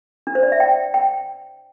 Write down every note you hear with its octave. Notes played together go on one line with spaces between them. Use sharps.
D4
C5
D5
E5
G5
G5